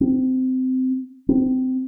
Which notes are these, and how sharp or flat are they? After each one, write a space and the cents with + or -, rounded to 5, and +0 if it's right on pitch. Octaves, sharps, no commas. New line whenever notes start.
C4 -20
C4 -25